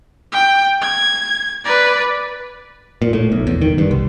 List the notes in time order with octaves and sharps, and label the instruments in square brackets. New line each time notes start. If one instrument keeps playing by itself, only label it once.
[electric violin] G5
G#6
B4 D5
[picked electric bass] A#2
A2
B1
E2
D#3
G2
C2